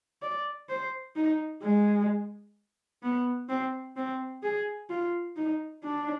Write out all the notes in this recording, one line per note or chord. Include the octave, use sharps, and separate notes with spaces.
D5
C5
D#4
G#3
B3
C4
C4
G#4
F4
D#4
D4